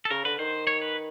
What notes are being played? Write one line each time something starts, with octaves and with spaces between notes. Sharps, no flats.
A4
C#3 A#4
D3 B4
D#3 C5
C#5
B4